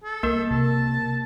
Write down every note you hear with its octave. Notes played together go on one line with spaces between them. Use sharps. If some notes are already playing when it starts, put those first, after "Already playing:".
A4
C2 A#3 A#4
C3 A5